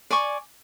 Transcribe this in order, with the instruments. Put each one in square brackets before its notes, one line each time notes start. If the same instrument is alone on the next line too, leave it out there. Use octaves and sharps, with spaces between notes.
[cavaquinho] D5 G#5 C#6